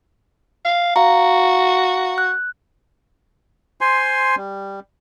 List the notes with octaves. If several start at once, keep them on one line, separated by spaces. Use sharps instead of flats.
F5
F#4 F5 A#5
F#6
C5 G#5 C6
G3